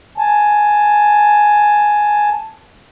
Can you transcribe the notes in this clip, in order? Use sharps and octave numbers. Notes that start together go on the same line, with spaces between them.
G#5 A5